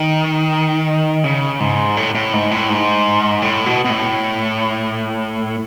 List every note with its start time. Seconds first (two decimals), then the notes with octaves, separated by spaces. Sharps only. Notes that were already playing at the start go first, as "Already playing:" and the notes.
Already playing: D#3
1.24 C#3
1.60 G#2
1.97 A2
2.15 A2
2.33 G#2
2.51 A2
2.69 G#2
3.42 A2
3.66 B2
3.85 B2
3.90 A2